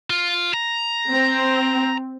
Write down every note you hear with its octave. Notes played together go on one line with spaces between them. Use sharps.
F4
A#5
C4